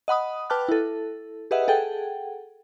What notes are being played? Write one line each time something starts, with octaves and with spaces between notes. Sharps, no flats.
D#5 F#5 B5 D#6
B4 G5 A5 D6 F6 F#6
E4 A4
G4 G#4 B4 D#5 E5 F#5
G#4 A4 F#5 G5